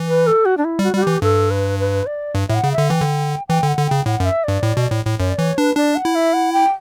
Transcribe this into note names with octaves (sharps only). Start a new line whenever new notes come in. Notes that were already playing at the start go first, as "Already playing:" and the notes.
Already playing: E3
B4
A4
F#4
D4
E4
G3 F#4
G3 F#4
E3 G4
G2 A4
B4
B4
D5
G2
A2 E5
F#5
C#3
E5
D3
E3 G5
D3
E3 G5
D3 F#5
D3
C#3 G5
A2 F#5
F#2 E5
G2 D5
A2
B2
A2
A2
F#2 C#5
D5
E3 C#5
D4 B4
D4 D5
F#5
E4
E5
F#5
G5